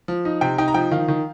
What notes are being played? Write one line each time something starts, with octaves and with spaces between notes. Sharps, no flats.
F3
D#4
C3 G5
D#4 G5
A#5
F3 G5
D#3 F5
D#3